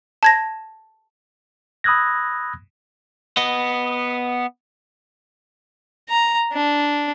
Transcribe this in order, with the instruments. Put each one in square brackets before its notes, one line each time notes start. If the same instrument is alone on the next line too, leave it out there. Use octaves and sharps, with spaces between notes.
[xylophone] A5 G#6 A#6
[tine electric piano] B5 D#6 E6 F#6 G#6 A#6
[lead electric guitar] B3 D#5
[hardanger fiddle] A#5
D4